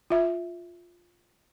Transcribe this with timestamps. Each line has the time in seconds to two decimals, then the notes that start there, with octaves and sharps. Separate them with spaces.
0.10 F4 E5